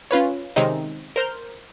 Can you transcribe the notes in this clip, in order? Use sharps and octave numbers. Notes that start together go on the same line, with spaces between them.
C#4 F4 B4 C#5
C3 D#3 G#3 C4 C#4 D#4
A#4 C5 F6 G6